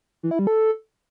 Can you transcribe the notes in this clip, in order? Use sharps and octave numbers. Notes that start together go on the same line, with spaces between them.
E3
E4
G3
A4